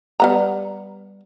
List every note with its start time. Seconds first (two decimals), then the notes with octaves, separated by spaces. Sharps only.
0.20 G3 B3 A#5